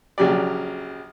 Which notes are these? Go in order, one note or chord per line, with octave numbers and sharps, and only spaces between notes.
A#1 C#3 F#3 G4 D5